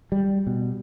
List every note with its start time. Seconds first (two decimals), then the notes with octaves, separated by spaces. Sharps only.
0.12 G3
0.47 B2